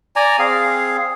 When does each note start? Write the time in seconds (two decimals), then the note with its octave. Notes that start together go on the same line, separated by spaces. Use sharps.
0.16 D5 G#5 A#5
0.39 C4 G#4 F5